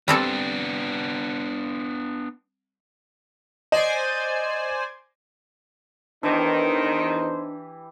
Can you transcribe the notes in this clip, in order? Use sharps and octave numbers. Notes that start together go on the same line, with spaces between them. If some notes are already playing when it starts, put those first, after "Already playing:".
G3 B3 C4 D4 A4
C5 D5 D#5 G#5
E2 D#3 E3 D4 D#4 G4 C5